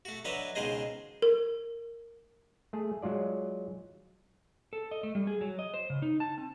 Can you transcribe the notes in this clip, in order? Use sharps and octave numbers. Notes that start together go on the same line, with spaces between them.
A3 F#4
D3 F#3 B4 D#5 E5
C#2 B2 D#3 G#4 C5 D#5
A#4
A3 G#4
F#3 G#3 F4 D5
A4
D#5
A3
G3
G#4
F#3
D#5
C5
C#3
D#4
A5
C4